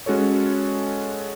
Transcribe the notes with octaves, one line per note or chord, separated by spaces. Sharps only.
G#3 C#4 F#4 A4 C#5